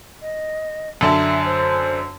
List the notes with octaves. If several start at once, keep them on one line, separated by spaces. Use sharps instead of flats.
D#5
F#2 D3 E5 A5
C5